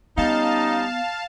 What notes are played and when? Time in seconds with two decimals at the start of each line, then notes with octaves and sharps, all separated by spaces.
0.18 G3 B3 C#4 D#4 F5 A5